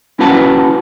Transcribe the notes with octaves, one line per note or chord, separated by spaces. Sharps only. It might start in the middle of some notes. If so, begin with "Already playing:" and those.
C#4 E4 F#4 B4 F#5 A5